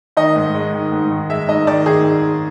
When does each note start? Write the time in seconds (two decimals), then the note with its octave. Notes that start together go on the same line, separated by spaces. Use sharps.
0.17 D#3 D#5
0.36 G#2
0.55 G#3
0.73 D#3
0.92 G#2
1.11 D#3
1.30 G#3 E5
1.48 G#2 D#5
1.67 D#3 D5
1.86 D#3 G#4